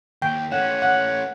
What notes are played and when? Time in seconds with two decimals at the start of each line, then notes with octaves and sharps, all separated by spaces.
0.22 D#2 G5
0.51 A3 C#4 C#5 F#5 E7
0.82 F#5